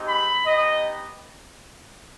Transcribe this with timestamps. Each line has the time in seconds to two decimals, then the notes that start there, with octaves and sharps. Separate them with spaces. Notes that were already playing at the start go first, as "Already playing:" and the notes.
Already playing: G#3 C4 D#4 G4
0.08 B5
0.46 B3 D#4 G4 D#5